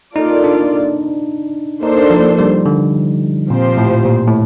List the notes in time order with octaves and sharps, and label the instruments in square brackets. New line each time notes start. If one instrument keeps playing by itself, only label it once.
[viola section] A#3 F4 A4 D5 [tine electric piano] D#4
[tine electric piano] D4
[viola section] A#3 D4 A4 C5 [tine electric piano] D#4
[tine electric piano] F3
G3
D3
[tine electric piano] A#2 [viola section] F3 C4 G4 C5
[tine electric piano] A2
A#2
A2